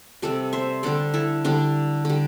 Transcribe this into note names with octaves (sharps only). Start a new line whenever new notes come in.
C3 G3 A4 D5
C5 E5
D3 G3 A4 D5
E4 A4
D3 G3 D4
D3 G3